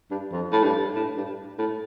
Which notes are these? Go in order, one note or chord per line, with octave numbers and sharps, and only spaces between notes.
G2
F2
A2
G2
A2
G2
A2